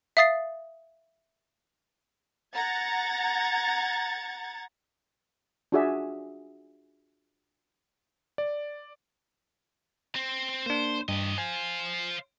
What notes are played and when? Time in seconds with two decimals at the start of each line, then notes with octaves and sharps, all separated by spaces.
0.17 E5 F5 D#6 A6 C7
2.56 F#5 A#5 G#6 A6
5.72 D4 F4 F#4 G#4 D5 E5
8.38 D5
10.15 C4
10.66 A#3 D4 C5
11.09 G2 G4 D#5
11.38 C5 F5 G#5